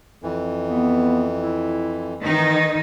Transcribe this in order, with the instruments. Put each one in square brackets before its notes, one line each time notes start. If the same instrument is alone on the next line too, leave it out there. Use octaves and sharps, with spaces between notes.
[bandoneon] F2 E3
[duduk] B3
E4
[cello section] D#3 D#4 [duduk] E3